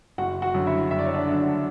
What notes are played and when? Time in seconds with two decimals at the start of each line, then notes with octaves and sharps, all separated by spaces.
0.18 F#1 F#4 F#5
0.42 F#4 F#5
0.54 F#2 D3
0.67 E4 E5
0.91 F#1 E5
0.99 D5
1.06 C#5
1.14 D4 D5
1.27 F#2 D3